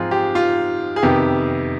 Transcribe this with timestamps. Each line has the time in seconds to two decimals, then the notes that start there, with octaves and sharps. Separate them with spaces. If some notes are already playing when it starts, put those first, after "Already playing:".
Already playing: G#2 F3 C4 D#4 F4 G#4
0.11 G4
0.35 F4
0.96 G#4
1.03 F2 C3 D#3 B3 G4